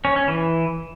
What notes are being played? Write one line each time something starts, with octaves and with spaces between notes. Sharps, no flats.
C#4
C#4
E3